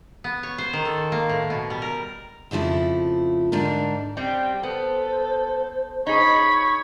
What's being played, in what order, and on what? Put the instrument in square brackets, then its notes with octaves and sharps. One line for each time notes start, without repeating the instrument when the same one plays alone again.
[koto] B3
C#5
C5
D#3
A4
A#3
A2
B2
G3
A#4
[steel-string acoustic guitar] F2 C#3 F3 A3 E4
G#2 D3 D4 D#4 A#4
[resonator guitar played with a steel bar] G3 C4 G4 [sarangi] G5
[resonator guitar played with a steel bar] B3 [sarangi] A4 [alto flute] C5
[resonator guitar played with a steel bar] D#4 G#4 [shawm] C#5 [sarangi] B5